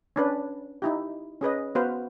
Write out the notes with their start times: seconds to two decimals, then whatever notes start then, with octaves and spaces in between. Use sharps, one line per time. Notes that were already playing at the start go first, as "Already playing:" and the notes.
0.16 C#4 D4 B4
0.82 D#4 E4 G4
1.41 C#4 G#4 B4 D#5
1.75 B3 F#4 B4 C5 F5